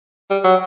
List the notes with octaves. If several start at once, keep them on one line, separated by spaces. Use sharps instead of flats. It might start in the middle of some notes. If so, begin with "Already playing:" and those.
G3
F#3